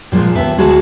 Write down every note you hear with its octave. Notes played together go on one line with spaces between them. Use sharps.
A#2 F3 G#3
D#2 B3 B4 E5 A5
D2 G#3 F#4 G#4 A5